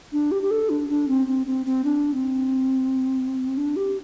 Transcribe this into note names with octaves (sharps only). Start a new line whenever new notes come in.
D4
G4
G4
A4
D4
D4
C4
C4
C4
C4
D4
C4
D4
G4